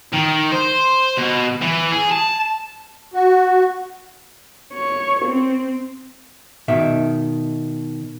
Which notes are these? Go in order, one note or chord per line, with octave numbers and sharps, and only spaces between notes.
D#3
C5
B2
E3
G#4
A5
F#4
C#5
C4
B2 D#3 E5